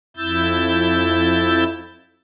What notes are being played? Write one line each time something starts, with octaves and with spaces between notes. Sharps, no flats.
F2 E4 E6 G6 A6